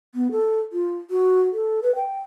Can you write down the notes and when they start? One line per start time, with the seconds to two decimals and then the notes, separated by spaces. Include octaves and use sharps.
0.15 B3
0.32 A4
0.73 F4
1.10 F#4
1.53 A4
1.83 B4
1.95 G5